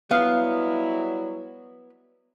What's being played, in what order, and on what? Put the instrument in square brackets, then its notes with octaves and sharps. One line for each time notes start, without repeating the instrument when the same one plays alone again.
[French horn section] F#3 G3 E4 [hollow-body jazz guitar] B3 [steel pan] F5